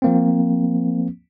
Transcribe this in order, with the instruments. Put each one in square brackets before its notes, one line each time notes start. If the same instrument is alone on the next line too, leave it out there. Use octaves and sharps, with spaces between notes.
[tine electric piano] F3 A#3 C4